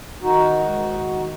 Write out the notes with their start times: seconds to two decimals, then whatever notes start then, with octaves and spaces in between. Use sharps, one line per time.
0.22 D#3 D#4 F#4
0.59 G#2
0.94 D#3